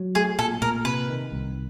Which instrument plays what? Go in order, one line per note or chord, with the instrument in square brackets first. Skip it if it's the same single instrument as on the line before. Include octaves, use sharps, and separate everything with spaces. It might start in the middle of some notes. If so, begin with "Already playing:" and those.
Already playing: [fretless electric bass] F#3
[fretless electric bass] A3 [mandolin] G#4
[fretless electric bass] A#2 [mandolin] A4
[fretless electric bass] A#2 [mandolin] A#4
[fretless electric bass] C3 [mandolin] B4
[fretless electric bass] D#3
C2